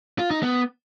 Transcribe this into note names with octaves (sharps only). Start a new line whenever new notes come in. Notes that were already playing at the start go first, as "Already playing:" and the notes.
F4
D#4
B3